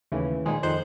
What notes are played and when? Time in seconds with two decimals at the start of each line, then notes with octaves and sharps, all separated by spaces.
0.12 D#2 A2 C#3 E3
0.46 A#2 D#3 F3 G#3
0.63 F2 D#3 F3 C5 F#6 G6